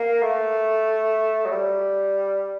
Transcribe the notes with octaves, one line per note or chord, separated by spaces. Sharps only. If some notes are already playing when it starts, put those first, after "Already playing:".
Already playing: A#3
A3
F#3
G3